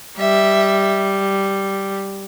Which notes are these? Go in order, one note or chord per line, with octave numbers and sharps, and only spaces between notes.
G3 E5